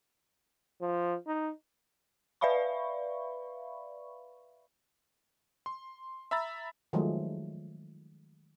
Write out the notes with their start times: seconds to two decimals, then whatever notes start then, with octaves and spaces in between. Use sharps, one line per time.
0.81 F3
1.27 D#4
2.41 B4 D5 E5 F5 B5 C#6
5.66 C6
6.31 E5 A#5 B5 E6 A6
6.93 D#3 F3 F#3 G#3 A3